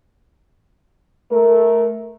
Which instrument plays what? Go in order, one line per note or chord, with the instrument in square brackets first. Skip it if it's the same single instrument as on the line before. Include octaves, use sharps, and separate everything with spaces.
[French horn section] A3 A#4